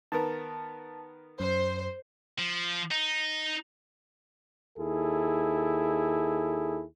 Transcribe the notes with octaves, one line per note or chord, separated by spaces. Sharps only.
D#3 B3 A#4 A5
F#2 C5
F3
D#4
D#2 E4 G#4 A4